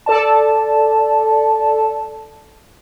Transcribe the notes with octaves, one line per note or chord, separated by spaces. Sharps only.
A4 D5 A5